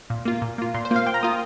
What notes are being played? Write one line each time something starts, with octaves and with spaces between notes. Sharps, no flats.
A#2
A#3 F4
A#2
A#3 F4
A#2 C6
C5
A#3 F4 F5
A#2 G5
A#5
A#3 F4 D#6